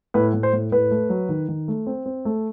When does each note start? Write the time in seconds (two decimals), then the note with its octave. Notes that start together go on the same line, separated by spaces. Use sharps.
0.14 A2 B4
0.34 A2
0.43 C5
0.53 A2
0.72 A2 B4
0.91 A3
1.09 F#3
1.29 D#3
1.48 D#3
1.68 A3
1.87 C4
2.06 C4
2.25 A3